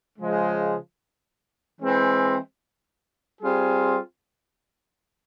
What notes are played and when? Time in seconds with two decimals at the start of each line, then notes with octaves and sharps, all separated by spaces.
0.19 C#3 F3 G#3
1.80 E3 G#3 C4
3.41 G3 C4 F4 G#4